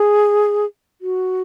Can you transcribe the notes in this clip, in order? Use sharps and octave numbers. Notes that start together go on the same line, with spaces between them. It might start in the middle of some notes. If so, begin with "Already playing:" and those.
Already playing: G#4
F#4